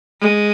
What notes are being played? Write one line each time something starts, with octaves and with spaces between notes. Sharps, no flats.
G#3